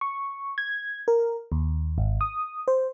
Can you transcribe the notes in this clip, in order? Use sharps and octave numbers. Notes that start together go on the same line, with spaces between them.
C#6
G#6
A#4
D#2
G#1
D#6
C5